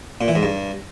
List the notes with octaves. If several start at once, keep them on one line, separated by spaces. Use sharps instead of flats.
A#2
E3
G#2
G2